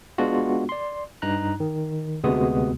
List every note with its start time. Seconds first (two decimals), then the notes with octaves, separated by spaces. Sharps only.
0.18 G#3 B3 D4 F4 F#4
0.69 D5 C6
1.22 G2 D#4 A#5 F#6
1.60 D#3
2.24 D2 C3 G#3 B3 F#4 D#6